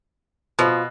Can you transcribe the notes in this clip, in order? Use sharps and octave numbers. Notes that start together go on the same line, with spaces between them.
B2 F3